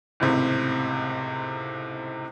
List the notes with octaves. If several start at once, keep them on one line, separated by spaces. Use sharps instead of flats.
G#1 C#2 A2 C3